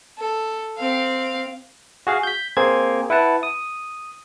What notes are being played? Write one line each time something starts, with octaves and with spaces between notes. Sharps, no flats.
A4
C4 F5
F#4 G#4 F5
G6 B6
A#3 C4 G#4 C5 G#6
E4 B4 F#5 A5
D#6